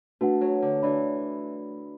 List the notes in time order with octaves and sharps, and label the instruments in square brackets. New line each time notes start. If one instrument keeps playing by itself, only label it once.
[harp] A3 [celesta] D4 F#4 B4 F#5
[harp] F#3
D3
[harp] E3 [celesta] D4 F#4 D5 B5